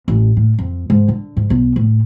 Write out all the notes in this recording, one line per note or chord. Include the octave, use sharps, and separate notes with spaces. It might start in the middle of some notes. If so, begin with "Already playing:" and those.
A1
A2
F2
G#2
D3
G#2
B1
A2